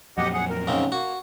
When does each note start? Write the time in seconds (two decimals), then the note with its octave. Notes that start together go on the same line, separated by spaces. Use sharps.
0.18 F2 A#2 F#3 G4 D#5 F#5
0.33 G#4 F#5
0.49 A#4
0.67 G#2 C#3 C4
0.92 A#3 F#4